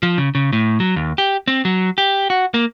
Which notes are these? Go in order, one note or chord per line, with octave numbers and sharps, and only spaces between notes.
F3
C#3
C#3
A2
F#3
D#2
G4
C4
F#3
G4
F#4
A#3